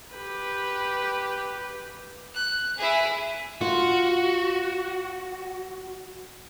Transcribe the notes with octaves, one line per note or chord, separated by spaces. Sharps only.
G4 B4
F#6
E4 G#4
F4 F#4